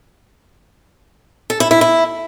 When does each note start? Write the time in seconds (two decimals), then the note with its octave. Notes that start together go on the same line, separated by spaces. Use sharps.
1.50 A4
1.60 E4
1.71 E4
1.81 E4